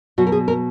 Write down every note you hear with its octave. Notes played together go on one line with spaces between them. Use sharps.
B2 F#3 F#4
A#4
G#4
A#4